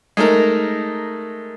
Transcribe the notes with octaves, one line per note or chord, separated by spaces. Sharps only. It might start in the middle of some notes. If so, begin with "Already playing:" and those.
G#3 A3 D#4 A#4